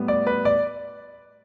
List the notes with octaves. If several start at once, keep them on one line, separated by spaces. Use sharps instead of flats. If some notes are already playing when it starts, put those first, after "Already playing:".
Already playing: A2 G3 B3
D5
B4
D5